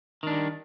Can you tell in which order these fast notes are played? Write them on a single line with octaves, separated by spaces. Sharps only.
D#3 D4 G3